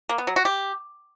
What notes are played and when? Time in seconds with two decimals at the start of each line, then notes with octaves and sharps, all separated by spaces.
0.09 A#3
0.18 B3
0.27 F#3
0.36 F#4
0.45 G4